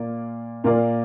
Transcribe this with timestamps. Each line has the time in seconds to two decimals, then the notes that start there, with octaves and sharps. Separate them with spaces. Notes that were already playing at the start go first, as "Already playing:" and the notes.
Already playing: A#2 A#3 F4 D5
0.64 A#2 A#3 F4 A#4 D5